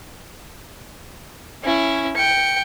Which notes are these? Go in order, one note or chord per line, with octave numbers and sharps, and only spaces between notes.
C#4 E4
G5 C#7